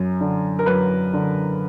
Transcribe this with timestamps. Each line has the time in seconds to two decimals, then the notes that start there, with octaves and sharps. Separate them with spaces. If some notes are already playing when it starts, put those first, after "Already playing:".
Already playing: F#2
0.21 D3
0.59 A#4
0.66 F#2 B4
1.13 D3